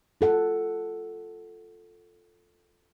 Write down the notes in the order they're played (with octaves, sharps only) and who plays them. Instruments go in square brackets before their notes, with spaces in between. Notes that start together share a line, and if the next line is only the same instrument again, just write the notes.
[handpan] F4 A4 F#5